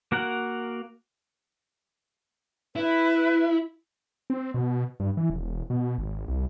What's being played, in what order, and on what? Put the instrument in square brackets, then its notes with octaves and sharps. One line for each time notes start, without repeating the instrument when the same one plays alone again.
[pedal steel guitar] A#3 F#4 A#4 F#5
[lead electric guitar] E4 [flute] B4
[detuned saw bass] C4
B2
G2
E3
E1
B2
G#1
C2